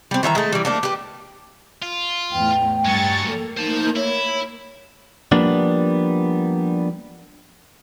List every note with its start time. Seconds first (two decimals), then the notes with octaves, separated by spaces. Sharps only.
0.11 G3 C4
0.23 D#3 E3 E5 A#5
0.35 G#3 A3
0.52 E3 G3
0.65 A3 A#3 D4
0.83 G4 B4
1.83 F4
2.32 E2 A2 G5
2.85 G2 F#3 G#3 C#6 A6
3.27 A#3 A4
3.57 D#4 C5 A5
3.96 E4 C#5
5.32 F3 G3 A#3 B3 D4